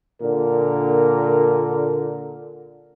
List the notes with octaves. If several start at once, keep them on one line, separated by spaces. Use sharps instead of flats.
A#2 D3 A#4